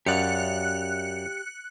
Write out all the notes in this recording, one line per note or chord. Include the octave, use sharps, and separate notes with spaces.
F#2 G4 D5 F5 F#6 C#7